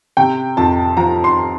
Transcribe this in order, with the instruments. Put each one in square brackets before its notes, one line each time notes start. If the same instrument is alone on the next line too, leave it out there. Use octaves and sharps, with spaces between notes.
[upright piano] C3 G5
F2 A5
F3 A#5
C6